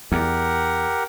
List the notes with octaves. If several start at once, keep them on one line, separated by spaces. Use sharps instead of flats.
E2 G4 A#4 F#5